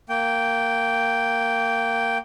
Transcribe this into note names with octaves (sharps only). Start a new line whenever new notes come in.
A#3 G5